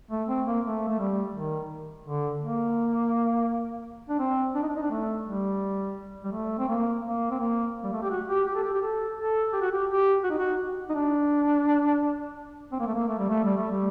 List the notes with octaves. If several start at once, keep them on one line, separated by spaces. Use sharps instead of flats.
A3
C4
A#3
A3
A3
G3
D#3
D3
A#3
D4
C4
D4
D#4
D4
D#4
D4
A3
G3
G3
A3
C4
A#3
A#3
C4
A#3
G3
A3
G4
F#4
G4
G4
A4
G4
G4
A4
A4
G4
F#4
G4
G4
F#4
D#4
F#4
D#4
D4
C4
A#3
A3
A#3
A3
G3
A3
G3
A3
G3